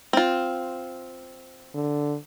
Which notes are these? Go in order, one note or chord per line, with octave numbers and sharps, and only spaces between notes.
C4 F4
D3